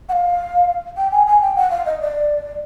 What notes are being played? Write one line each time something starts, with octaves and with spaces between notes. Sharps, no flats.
F#5
F5
G5
G#5
G#5
G5
F#5
F5
D#5
D5